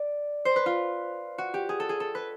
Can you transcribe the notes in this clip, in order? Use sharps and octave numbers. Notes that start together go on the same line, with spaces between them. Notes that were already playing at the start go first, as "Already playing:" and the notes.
Already playing: D5
C5
B4
F4
F#4
G4
G#4
A4
G#4
A4
B4